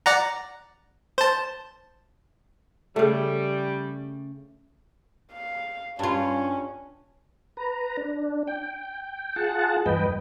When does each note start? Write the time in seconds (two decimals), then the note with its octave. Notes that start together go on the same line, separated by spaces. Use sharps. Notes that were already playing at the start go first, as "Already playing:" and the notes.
0.06 D5 F#5 A#5
1.18 C5 A5
2.96 C#3 G3 A3
5.33 F5
5.99 G2 C#4 F4
7.57 B4 A#5
7.97 D4
8.47 G5
9.36 F4 G#4 F#5 A5
9.86 E2 G2 B4 D#5 G5